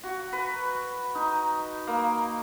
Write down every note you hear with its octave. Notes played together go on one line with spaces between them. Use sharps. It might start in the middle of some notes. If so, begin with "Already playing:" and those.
F#4
B4
D#4
A#3